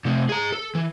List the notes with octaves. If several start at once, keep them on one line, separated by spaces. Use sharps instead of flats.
C3 A3
G#4 A#5
A4
E3